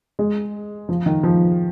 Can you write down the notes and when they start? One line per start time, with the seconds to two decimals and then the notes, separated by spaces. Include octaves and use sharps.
0.19 G#3
0.89 F3
1.06 D#3
1.23 F3